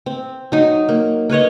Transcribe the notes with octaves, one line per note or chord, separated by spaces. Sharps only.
C4
F#3 D#4
A#3
A#3 B4 C#5 D#5